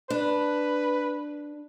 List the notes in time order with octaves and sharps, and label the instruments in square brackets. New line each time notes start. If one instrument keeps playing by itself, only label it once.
[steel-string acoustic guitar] D4 [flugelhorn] B4